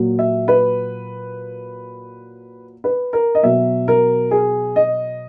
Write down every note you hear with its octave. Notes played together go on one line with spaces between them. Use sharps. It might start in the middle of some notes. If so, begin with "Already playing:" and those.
Already playing: A#2 F#3
E5
B4
B4
A#4
D#5
B2 F#3 E5
A#4
G#4
D#5